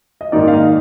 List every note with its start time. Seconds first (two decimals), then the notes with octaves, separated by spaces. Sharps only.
0.21 D#5
0.32 G#2 D#3 A#3 D#4 D5
0.48 F5
0.53 D#5